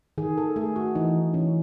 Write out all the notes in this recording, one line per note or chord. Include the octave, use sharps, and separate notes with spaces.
D#3 G#4
A4
A3 G#4
F#4
E3 D#4
E3 C#4